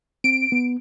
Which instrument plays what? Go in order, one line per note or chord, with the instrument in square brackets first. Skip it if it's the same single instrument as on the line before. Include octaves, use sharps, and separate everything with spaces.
[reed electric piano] C4 [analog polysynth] D7
[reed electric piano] B3